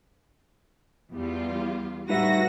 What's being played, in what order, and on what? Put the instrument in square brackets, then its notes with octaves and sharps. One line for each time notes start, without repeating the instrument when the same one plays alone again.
[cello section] E2 [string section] G3 F4
[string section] A2 A#6 [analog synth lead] G3 [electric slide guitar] D#4 B4 E5 [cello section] F#4